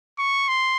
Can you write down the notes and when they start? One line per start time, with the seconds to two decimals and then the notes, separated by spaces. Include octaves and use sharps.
0.18 C#6
0.48 C6